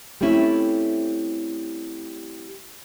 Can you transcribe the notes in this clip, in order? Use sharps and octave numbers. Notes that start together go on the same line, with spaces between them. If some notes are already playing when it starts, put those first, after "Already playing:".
G3 A3 C4 C#4 E4